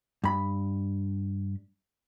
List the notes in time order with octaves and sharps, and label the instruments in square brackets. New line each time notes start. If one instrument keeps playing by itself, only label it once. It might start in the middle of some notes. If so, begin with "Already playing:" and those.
[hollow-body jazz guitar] G2 B5